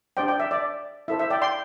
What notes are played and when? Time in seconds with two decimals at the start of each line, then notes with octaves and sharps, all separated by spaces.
0.17 D4 G4 C5 D5 G5
0.28 D5 G5
0.40 E5
0.51 D5
1.08 E4 A4 C5 E5
1.19 E5
1.30 D5 G5
1.42 G5 C6